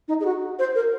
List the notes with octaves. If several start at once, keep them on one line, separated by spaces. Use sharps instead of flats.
D#4
G#4
F#4
C5
A#4